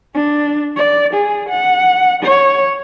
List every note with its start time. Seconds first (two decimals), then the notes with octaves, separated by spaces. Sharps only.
0.14 D4
0.76 D5
1.14 G#4
1.49 F#5
2.24 C#5